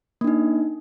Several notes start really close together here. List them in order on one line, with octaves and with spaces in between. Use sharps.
A#3 D4 D#4